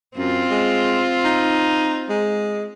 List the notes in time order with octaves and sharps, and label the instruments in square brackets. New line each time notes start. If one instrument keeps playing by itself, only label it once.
[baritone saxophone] F#2 [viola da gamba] C4 F4
[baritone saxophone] G#3
D#4
G#3